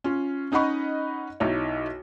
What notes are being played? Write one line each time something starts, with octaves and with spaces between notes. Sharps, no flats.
C#4 F4
C#4 D#4 D#5 F#5 B5 C#6
B1 D#4 E4 C#5